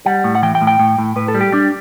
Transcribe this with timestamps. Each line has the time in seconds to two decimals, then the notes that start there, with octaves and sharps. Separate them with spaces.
0.06 G3 F#5
0.24 A2
0.35 F#5
0.43 E3 G5
0.55 G5
0.61 A2
0.67 G5
0.80 A2
0.98 A2
1.16 A2 B4
1.28 A4
1.34 G3
1.41 G4
1.52 G3 D4